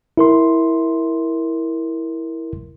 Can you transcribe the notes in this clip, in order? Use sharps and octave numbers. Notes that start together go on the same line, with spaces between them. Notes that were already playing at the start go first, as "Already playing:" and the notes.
E4 A#4 C6